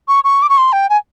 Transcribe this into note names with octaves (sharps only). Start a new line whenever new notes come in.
C#6
C#6
D6
C#6
C6
G5
G#5